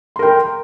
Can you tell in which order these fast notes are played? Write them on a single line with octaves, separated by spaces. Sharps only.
C6 A#4 G5